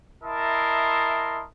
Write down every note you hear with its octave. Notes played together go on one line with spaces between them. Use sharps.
E4 A#4 D#5 E5 A5 C6